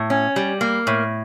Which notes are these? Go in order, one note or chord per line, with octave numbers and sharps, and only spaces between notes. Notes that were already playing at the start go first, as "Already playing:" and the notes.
Already playing: A2
C#4
G3
A#3
A2